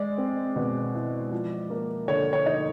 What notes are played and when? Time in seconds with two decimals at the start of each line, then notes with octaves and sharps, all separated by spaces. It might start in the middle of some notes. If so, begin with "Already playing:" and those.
Already playing: G#3 D5
0.18 C4
0.56 B2
0.94 E4
1.31 F3
1.70 A#3
2.08 D3 C#5
2.33 C#5
2.46 D#4